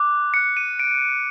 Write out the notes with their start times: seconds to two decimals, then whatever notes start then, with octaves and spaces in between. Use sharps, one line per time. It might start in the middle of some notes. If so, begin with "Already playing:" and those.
Already playing: D6 F#6
0.34 D6 F#6 C#7
0.57 D#7
0.79 D7